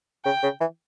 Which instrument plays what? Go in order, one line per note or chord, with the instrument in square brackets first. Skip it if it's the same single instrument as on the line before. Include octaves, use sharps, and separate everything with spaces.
[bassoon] C#3 [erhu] G5
[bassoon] C#3
E3